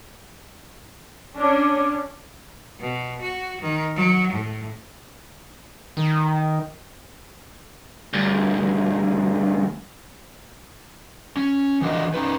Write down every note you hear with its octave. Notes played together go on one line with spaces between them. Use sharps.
C#4 D4
B2
F#4
D#3
F#3
A2
D#3
D2 G2
C#4
E3 F3 D4 F#4 A#4 D#5
C#4 D#4 B4